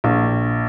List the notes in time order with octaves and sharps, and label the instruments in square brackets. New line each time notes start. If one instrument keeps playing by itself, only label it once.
[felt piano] A#1